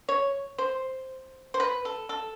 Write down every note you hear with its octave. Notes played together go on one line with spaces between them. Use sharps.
C#5
C5
C5
B4
A4
A4